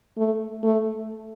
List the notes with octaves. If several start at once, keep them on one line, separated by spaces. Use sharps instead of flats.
A3
A3